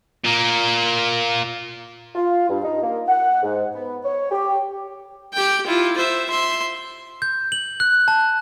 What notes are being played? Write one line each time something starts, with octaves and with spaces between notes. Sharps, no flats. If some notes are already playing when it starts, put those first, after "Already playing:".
A#2 A#3
F4
G2
D#4
A#3
F#5
G#2
B3
C#5
G4
G4 G5
E4 F4
C5 E5
E5 C6
G6
F#7
F#6
A5